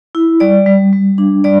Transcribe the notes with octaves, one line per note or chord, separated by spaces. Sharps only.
E4
G3 D5
G3
G3
D4
G3 D5